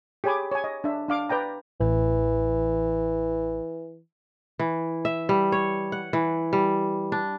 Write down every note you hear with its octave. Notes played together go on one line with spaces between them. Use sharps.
G4 G#4 C#5 G#5 B5 D6
C#5 G#5
D#5
D4 E5
D4 F5 D6
B4 D5 G5 A#5
A1 E3
E3
E5
G3
C#5
F#5
E3
G3
D4